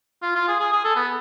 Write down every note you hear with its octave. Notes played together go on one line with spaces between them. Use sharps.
F4
F4
G#4
G#4
G#4
A4
B3